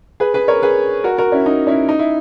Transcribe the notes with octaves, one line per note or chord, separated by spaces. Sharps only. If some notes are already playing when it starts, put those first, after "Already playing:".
G#4 B4
G#4 B4
A#4 C#5
G#4 B4
F#4 A#4
F#4 A#4
C#4 E4
D#4
C#4 E4
D#4
E4